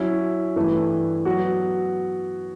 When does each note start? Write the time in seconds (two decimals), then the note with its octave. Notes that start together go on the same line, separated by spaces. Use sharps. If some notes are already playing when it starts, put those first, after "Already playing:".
Already playing: F#3 C#4 E4
0.56 G2 E3 A3 E4 B4
1.25 F#3 B3 F#4